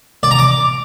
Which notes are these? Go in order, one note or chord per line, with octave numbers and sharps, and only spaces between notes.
D5
A#5
D6